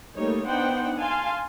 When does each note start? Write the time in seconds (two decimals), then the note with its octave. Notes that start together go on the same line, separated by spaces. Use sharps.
0.16 G3 A3 A#3 D#4 C#5
0.46 B3 D4 D#4 C5 F#5 G5
0.99 F5 G#5 A5 C6